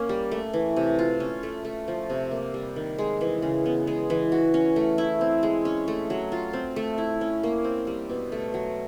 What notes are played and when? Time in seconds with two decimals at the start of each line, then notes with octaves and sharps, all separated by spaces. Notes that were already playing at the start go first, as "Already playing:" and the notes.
Already playing: A#3 C#4
0.09 G3
0.31 A3
0.53 E3
0.76 C3
0.99 F4
1.20 C#4
1.43 A3
1.65 A3
1.88 F3
2.10 C3
2.31 A#3
2.54 G3
2.76 D#3
2.98 G#3
3.21 E3
3.42 C#3
3.65 B3
3.87 G#3
4.10 E3
4.32 F#4
4.54 C#4
4.76 A3
4.98 E4
5.21 C4
5.43 G#3
5.65 C#4
5.88 A3
6.10 F#3
6.32 F4
6.53 C4
6.76 A3
6.98 E4
7.21 C#4
7.43 A#3
7.64 C4
7.87 G3
8.10 B2
8.32 A3
8.54 F#3